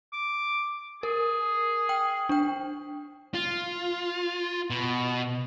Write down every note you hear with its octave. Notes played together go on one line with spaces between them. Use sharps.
D6
G#4 A#4
G5
D4 G5
F4
B2